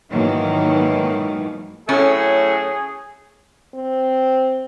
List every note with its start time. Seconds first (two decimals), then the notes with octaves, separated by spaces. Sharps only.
0.10 G#2 B2 D#3 E3 F#3 A#3
1.89 A2 F#3 A3 C#4 G#4
3.74 C4